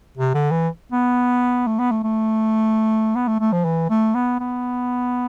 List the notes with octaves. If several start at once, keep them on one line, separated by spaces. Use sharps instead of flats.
C3
D3
E3
B3
A3
B3
A3
A3
B3
A3
A3
F3
E3
A3
B3
B3